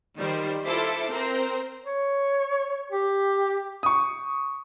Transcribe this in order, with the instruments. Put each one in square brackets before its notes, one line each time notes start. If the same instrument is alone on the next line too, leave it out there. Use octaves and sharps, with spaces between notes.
[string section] D#3 G3 C5
E4 F4 A4 C5 E5 D6
C4 A#4 C5
[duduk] C#5
G4
[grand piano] C#6 D#6